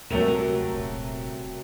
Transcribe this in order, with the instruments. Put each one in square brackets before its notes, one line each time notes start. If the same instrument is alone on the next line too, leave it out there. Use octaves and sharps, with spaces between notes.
[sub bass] C#2 [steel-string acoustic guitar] C3 A#4 [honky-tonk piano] F#3 A3 F7
[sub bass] D#1